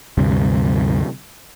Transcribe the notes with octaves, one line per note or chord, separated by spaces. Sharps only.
D2 G2 C3 G3